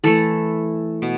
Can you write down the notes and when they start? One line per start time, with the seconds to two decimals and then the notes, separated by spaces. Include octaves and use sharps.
0.04 E3 A3 A4
1.02 B2